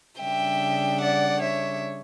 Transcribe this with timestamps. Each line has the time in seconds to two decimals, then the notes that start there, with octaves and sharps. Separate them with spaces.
0.20 C#3 G3 D4 E5 G5
1.00 D5 F#5
1.41 C#5 E5